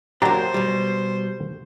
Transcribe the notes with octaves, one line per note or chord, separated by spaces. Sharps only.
F#3 A#3 D4 G4 C5 A#5
B2 G3